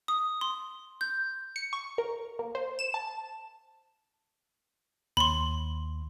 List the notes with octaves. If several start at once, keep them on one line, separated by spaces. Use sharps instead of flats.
D#6
C6
G6
C#7
C#6
A#4
A#3
C5
E7
A5
D#2 B5 C6